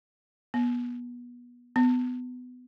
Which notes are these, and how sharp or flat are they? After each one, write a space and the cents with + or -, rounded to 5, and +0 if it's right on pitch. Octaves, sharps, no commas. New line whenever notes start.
B3 -25
B3 +20